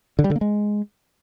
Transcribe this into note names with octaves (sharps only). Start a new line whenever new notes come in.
D3
G3
D3
A#3
G#3